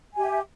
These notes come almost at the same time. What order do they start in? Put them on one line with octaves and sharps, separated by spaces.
G#5 G4 E5